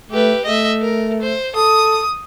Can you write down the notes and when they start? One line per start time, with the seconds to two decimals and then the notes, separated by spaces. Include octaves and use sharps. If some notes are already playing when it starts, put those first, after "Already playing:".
0.11 A3 G4 B4
0.45 A3 D#5 E5
0.81 A#4
1.22 C5
1.55 A4 D#6